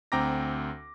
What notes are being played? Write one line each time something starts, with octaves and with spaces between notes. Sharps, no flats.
D2 C4 G5 A#5 D6 A#6